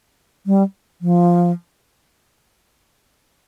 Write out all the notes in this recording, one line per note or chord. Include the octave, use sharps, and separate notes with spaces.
G3
F3